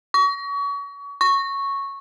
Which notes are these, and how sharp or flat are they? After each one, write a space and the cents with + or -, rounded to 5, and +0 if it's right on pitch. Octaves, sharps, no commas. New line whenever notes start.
C#6 +35
C#6 -5